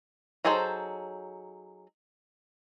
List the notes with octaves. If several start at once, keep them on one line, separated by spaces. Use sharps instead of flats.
F#3 D#4 G#4 A4 C5